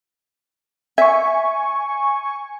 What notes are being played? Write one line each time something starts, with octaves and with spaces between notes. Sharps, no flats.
E5 G#5 C#6